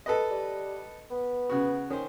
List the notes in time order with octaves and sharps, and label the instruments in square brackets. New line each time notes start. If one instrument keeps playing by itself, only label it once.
[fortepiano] A4 B4 D#5
[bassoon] G3
B3
[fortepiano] C#3 F#4
[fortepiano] D#3 C5 [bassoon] C#4